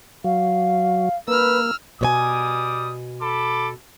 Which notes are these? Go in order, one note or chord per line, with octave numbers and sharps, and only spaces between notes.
F#3 F5
A#3 B4 E6 F6
B2 G3 C#5 G#5 D6 D#6
A4 B5 D6